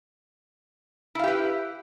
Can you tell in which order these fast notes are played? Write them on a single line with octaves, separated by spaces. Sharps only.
E4 F5 G4 B4